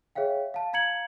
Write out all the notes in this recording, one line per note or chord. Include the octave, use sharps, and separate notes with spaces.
G#4 C#5 E5 F5 G5
F5 A5
F5 A#5 G#6 C#7 F#7